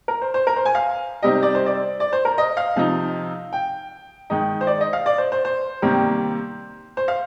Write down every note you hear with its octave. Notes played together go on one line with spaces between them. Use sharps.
A#4
C5
C5
A#4
C5
G#5
F5
C3 G3 C4 D#4 D#5
D5
C5
D5
D5
C5
A#4
D#5
F5
C3 F3 C4 D#4
G5
D#3 G#3 D#4
C5
D5
D#5
F5
D5
C5
C5
C5
C3 D#3 G3 A#3
C5
F5